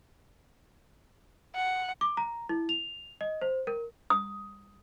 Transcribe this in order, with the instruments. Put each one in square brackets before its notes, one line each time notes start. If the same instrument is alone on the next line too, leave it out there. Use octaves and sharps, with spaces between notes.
[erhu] F#5
[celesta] D6
A#5
E4
F7
D#5
C5
A#4
[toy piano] D#6